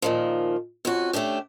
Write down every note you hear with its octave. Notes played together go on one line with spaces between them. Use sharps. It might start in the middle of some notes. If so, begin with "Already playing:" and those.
A#2 D#3 F3
F2 C#4 F#4
A3 C#4 D4 G4